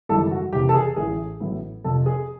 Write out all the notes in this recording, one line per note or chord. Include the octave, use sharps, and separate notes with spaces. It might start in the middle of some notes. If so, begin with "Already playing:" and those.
G#1 F#2 C#3 E3 G3 A4
F#4
F1 E2 C#3 G4
A4
G#4
A1 A2 E3 G#4
A1 A2 F#3 B3 E4
F1 F2 C3 F3 A4
G#4